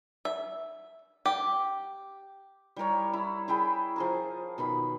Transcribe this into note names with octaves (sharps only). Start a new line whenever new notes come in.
E5
G4
G3 E4 A#4 C#5
E4
E4 G#4 G5 B5
F3 G#4 A#4
B2 D#3 B5